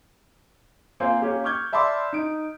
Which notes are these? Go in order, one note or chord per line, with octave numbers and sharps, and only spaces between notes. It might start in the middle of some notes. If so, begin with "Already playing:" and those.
A#3 C4 F4 C5 F5 G#5
A#3 C#4 G4
C#6 D6 F6 G6 G#6
D5 E5 A5 B5 C6 D6
D#4 D7